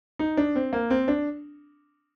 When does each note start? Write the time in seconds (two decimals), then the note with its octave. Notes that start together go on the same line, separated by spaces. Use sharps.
0.19 D#4
0.37 D4
0.56 C4
0.73 A#3
0.90 C4
1.08 D4